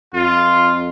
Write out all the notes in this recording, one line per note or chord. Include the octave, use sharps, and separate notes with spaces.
F2 F4